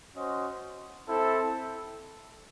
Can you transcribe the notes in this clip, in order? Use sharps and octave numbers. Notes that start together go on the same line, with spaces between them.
C#4 F#4 C5 D#5
C4 E4 A4